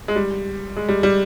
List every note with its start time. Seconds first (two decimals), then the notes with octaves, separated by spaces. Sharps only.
0.08 G#3
0.16 G3
0.77 G#3
0.89 G3
1.03 G3